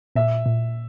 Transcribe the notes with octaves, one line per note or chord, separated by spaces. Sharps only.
A#2 E5
A#2